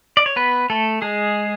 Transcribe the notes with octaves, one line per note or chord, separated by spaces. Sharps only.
D5
C#5
B3 B4
A3 A4
G#3 G#4